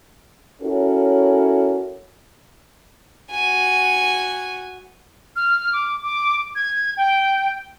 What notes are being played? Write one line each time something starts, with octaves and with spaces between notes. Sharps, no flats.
C#4 E4 F#4 A4 A#4 C#5
F#4 G#5
F6
D6
D6
G#6
G5